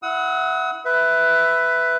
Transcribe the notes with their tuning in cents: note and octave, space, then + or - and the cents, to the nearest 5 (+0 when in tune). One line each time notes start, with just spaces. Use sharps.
E4 +5 F#5 +0 D#6 +45
B4 +10 E5 +0